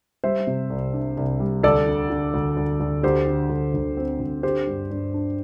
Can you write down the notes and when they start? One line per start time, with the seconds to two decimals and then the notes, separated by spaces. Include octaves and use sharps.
0.24 G3 C5 E5
0.47 C3
0.70 C2
0.93 D4
1.17 C2
1.40 G3
1.63 D2 A4 D5
1.86 D3
2.10 D3
2.34 D2
2.57 D2
2.80 D2
3.03 D2 G4 C5
3.27 D3
3.50 D2
3.74 D2
3.97 C4
4.20 D2
4.43 D3 G4 C5
4.67 G2
4.90 G2
5.14 D4